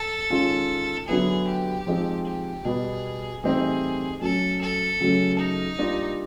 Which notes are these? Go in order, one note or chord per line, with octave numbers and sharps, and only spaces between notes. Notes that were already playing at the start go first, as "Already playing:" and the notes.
Already playing: A4
D#3 G#3 C#4 F4
D3 F#3 B3 E4 G#4
G4
F3 G#3 C4 D#4
G4
B2 G3 B3 G#4
A2 E3 G3 C4 D#4 G#4
F#3 A3 C#4 A4
A4
C#3 F#3 A3 C#4
D#4
G3 A#3 D4 F4